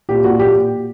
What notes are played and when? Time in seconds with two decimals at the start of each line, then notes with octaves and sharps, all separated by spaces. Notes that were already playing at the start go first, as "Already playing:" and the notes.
0.09 A#2 G4
0.24 A#2 F#4
0.39 A#2 G4